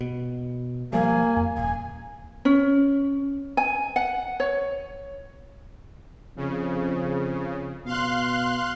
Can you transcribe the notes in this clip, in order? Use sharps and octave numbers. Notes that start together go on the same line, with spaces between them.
B2
F3 G3 A#3 G#5
F2
D#1 G#5
C#4
G#5
F#5
C#5
F2 C#3
B2 F5 C6 F#6